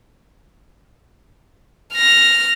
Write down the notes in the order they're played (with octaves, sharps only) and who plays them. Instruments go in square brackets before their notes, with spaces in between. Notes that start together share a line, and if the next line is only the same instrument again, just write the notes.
[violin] F6 A#6